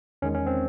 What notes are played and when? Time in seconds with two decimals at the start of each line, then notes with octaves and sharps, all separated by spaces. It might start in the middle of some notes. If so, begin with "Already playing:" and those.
0.22 E2 D#3 G#3 C#4
0.35 C#4
0.47 C4